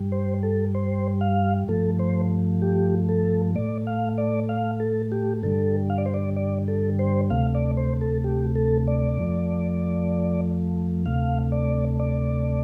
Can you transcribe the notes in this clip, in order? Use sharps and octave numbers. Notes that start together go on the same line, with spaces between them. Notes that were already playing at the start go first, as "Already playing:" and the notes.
Already playing: G2 G3
C5
A4
C5
F5
G2 F3 A3 A4
C5
G4
A4
A2 A3 D5
F5
D5
F5
A4
G4
G2 D3 G3 A4
F5
D5
C5
D5
D5
A4
C5
D2 C3 A3 F5
D5
C5
A4
G4
A4
D5
F2 F3 A3
D2 C3 A3 F5
D5
D5